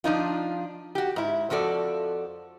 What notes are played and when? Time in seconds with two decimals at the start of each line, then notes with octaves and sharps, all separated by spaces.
0.04 F3 D4 D#4 F4
0.95 F#4 G4
1.16 G#2 E4
1.50 F2 F3 F#4 A4 D5